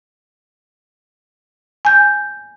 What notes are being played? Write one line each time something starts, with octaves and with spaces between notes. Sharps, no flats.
G#5 G6